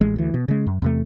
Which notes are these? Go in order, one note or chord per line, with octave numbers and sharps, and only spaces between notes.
A1 G#3
D2 E3
B2
C#3 G#3
F#2
E2 C3 A3